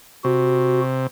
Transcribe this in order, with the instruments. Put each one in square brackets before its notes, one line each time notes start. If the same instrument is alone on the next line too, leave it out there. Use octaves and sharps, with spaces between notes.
[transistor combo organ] C3 [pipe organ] F#4